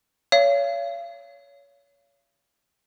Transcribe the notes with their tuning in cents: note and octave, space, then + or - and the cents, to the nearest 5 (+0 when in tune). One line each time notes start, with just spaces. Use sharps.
C#5 +30 F5 -35